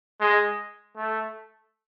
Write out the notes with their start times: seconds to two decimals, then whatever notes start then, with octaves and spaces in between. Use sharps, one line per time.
0.21 G#3
0.96 A3